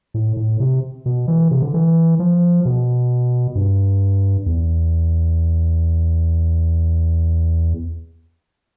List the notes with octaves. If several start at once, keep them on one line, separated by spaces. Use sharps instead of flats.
A2
A2
C3
B2
E3
C3
D3
E3
F3
B2
G2
E2